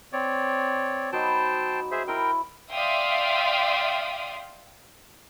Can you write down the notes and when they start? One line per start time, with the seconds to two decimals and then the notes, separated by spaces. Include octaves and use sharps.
0.13 C4 C#5 D5
1.13 F#3 B3 D#4 C5 G5 A5
1.91 G#4 C5 E5
2.08 E4 A#4 C5 G5
2.72 D5 E5 F5 G5 C6 D#6